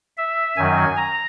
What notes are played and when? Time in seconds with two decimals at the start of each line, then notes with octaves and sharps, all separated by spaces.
0.17 E5
0.57 F#2 D#3 F#3 G#5
0.97 A#5